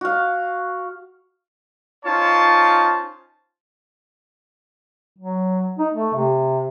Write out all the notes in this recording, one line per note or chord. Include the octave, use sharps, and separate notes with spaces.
F#4 F5
C#4 D#4 F4 C5 C#5 A5
F#3
D#4
A3
C3